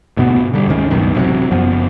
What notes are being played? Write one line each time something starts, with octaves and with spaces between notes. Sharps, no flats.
D2 G#2 B2 B3
D3 G3
C#2 G#2 D#3 C#4
C2 F#2 B2 D#3
A1 C3 E3 F#3
F#1 F#2 F3 B3